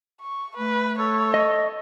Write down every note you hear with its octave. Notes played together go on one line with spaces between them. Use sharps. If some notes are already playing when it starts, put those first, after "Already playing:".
C#6
A3 B4
A4 C#5
D#5